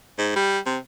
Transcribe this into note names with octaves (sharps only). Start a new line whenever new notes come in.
G#2
G3
C3